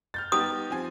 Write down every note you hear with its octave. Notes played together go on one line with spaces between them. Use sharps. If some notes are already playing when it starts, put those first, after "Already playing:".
F6 G6 A6
B3 D#4 G4 D#6
F3 C4 G#5